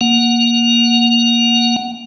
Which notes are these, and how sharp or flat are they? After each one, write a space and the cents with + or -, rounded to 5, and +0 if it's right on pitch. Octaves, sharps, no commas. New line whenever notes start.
A#3 +15 F#5 +0